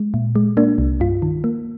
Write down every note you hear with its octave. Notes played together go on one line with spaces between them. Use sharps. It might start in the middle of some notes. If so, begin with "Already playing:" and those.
Already playing: G#3
A#2
G#3
A#3 D4
C2
G2 F4
D#3
A#3